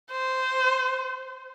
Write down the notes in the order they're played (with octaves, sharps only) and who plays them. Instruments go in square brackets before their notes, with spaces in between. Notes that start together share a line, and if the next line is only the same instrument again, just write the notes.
[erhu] C5